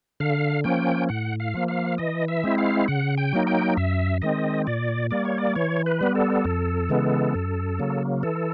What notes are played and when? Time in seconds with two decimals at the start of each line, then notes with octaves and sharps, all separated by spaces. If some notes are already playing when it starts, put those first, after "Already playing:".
0.20 D3 F5
0.64 F3 A#3 C#4 G5
1.09 A2 F#5
1.40 F5
1.54 F3 A#3
1.68 F5
1.98 E3 D#5
2.28 E5
2.44 G#3 C4 E4
2.58 F5
2.88 C#3 F#5
3.18 G5
3.33 F#3 A#3 D#4
3.47 G5
3.77 F#2 E5
4.22 D#3 G#3 C4 D#5
4.67 A#2 D5
5.11 G3 A#3 D5
5.25 C#5
5.38 D5
5.55 E3 C#5
5.86 B4
6.01 G3 B3
6.15 A4
6.45 F2
6.89 C#3 E3 G#3 B3
7.35 F#2
7.79 C#3 F#3 A#3
8.23 E3 A4